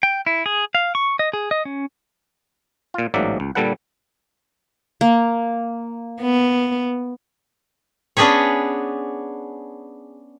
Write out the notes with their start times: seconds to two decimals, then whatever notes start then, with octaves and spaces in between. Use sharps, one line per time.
0.03 G5
0.26 E4
0.46 G#4
0.75 F5
0.95 C#6
1.19 D#5
1.33 G#4
1.51 D#5
1.65 C#4
2.94 A#2 F4
3.14 A1 G#2 F#3 A#3 D5 E5
3.40 C#2
3.55 A#2 D3 G3 A4 B4 F#5
5.01 A#3
6.21 B3
8.17 B3 C#4 D4 G#4 B4 C#5